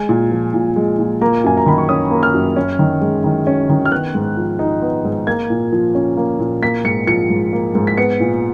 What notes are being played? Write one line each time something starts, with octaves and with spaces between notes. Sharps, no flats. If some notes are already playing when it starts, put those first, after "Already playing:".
Already playing: G#3 G#5
A#2
F3
A#2
G#3
A#2
A#3 A#5
F#2 G#5
A#5
D#3 B5
C#6
C#4 D#6
A#3
F6
F#2
C#4
D#3
G#3
D#3
C#4
D#3
F6
B3 F#6
G#2
F3
D#4
B3
G#2
A#3 G#6
A#2
F3
C#4
A#3
A#2
A#3 B6
G#2 C#7
F3 C#7
G#2
A#3
G#2
B6
B3 C#7
A#2